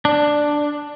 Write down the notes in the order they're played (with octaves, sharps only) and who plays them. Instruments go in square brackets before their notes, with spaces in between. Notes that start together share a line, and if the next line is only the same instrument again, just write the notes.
[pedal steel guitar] D4